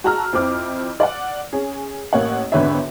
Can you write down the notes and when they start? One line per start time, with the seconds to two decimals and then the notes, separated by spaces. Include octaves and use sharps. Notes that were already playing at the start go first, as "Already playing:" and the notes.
0.04 F#4 G#4 A5 A#5 E6 F6
0.33 F2 C4 E4 D6 F6
1.00 D5 F#5
1.53 C#4 G#4
2.13 A1 A#3 C#5 F#5
2.52 G#1 E2 D3 B4 C#5 E5